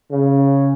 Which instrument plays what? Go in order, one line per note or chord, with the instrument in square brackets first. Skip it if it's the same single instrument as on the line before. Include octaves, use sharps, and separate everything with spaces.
[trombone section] C#3